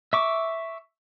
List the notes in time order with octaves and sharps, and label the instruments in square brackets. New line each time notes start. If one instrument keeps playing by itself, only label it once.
[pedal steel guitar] E5 C#6 D6